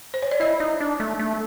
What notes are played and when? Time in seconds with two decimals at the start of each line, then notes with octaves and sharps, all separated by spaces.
0.14 C5
0.22 C#5
0.31 D5
0.40 E4 D#5
0.60 D#4
0.80 D4
1.00 A3
1.19 A3